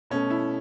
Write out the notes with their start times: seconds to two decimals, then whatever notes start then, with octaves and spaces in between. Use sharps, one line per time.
0.10 B2 A3 C#4
0.30 E4